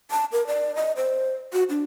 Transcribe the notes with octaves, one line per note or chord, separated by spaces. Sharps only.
A5
A#4
D5
D#5
C5
F#4
D4